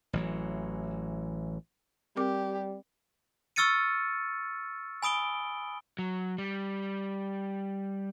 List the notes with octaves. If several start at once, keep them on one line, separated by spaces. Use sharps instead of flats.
A1 E3 F#3
G3 C4 G4 A#4 D6
C#6 E6 F6 A6 C#7 D#7
G#5 B5 D#6 D7 G7
F#3
G3